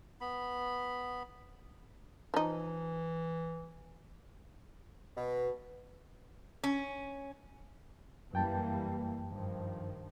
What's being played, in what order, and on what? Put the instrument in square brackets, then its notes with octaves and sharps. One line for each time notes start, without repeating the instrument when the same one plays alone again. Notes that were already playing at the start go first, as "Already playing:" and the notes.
[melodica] B3 B5
[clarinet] E3 [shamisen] F3 D#4
[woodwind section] B2
[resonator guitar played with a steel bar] C#4
[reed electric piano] F#2 G5 A5 [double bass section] E3 G3 A#3
[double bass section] G2 D#3 F3